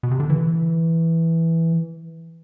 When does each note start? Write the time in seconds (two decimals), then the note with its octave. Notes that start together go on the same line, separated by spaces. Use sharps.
0.03 B2
0.11 C3
0.20 D3
0.30 E3